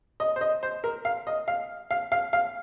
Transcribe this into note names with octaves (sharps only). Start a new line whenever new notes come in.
D#5
C5
D#5
C5
A#4
F5
D#5
F5
F5
F5
F5